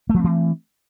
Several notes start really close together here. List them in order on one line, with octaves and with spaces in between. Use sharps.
A3 F3 C4 E3